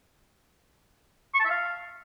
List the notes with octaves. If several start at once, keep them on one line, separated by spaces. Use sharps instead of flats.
C#6
A5
E5
F5